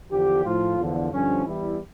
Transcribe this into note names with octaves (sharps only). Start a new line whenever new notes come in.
E2 D3 F3 G4
A2 F3 F4
E2 D3 F3
G2 D3 F3 C#4
E2 E3 G3 E4